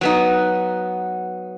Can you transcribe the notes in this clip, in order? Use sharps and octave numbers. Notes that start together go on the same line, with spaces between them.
F#3 B3 D#4